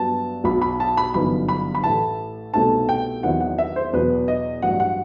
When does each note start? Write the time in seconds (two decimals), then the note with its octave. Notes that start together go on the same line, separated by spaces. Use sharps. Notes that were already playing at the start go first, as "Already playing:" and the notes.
Already playing: G2 F#3 B3 A5
0.44 B1 B2 F#3 B5
0.62 B5
0.80 A5
0.97 B5
1.14 G1 F#2 E3 B3 D#4 B5
1.49 B5
1.75 B5
1.84 A1 A2 E3 A3 A5
2.54 C2 B2 A3 C4 D#4 A5
2.89 G5
3.23 E2 D#3 F#3 C4 E4 F#5
3.40 F#5
3.58 E5
3.76 C5
3.93 E2 B2 F#3 B4
4.28 D#5
4.62 A1 G2 F#3 F#5
4.80 F#5